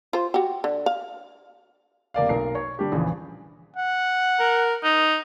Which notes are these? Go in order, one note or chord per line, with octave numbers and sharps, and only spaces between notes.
F4 C5
F#4 G4
D3
F5
F1 A#3 D5 F5
B1 A#4 C7
C#5
D3 G3 D4 G4
A#1 E2 C#3 E3
F#5
A#4
D#4